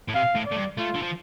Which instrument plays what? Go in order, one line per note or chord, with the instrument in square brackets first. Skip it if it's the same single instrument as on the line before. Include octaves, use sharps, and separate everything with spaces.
[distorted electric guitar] A2
[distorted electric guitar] C3 [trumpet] F5
[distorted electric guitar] A2
[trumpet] D5
[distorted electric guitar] A2
G2
[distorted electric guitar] A3 [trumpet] F4
[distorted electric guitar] D3
F3